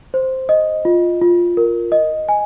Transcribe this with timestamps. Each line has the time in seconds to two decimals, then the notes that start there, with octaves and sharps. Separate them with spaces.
0.14 C5
0.49 D#5
0.85 F4
1.22 F4
1.57 A#4
1.92 D#5
2.29 G#5